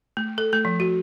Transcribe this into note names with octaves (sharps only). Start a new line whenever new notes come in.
A3
A4
A3
F3
F#4